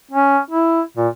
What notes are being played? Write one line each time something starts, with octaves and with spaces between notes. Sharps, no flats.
C#4
E4
A#2